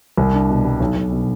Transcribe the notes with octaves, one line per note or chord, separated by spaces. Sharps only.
C2
D4
B2
G3
B1
B1
B2